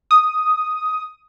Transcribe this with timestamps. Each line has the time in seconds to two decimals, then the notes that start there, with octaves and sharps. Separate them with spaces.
0.11 D#6